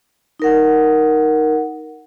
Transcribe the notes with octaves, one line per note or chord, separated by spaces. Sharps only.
D#4 A#4 F#5